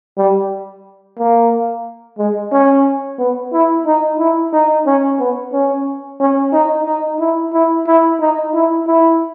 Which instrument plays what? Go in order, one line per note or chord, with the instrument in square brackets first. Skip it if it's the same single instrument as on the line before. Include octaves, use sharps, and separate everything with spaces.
[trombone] G3
A#3
G#3
C#4
B3
E4
D#4
E4
D#4
C#4
B3
C#4
C#4
D#4
D#4
E4
E4
E4
D#4
E4
E4